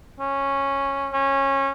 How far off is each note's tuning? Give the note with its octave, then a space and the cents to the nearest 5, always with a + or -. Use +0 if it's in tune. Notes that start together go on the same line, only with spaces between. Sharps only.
C#4 -10
C#4 -20